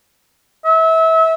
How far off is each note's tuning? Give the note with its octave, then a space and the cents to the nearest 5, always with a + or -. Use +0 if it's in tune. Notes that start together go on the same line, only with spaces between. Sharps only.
E5 -30